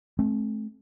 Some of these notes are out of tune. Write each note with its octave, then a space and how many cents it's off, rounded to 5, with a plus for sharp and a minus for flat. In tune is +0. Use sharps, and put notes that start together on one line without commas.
A3 -35 C4 +25